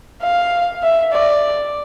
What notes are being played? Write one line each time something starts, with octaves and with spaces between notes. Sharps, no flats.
F5
E5
D5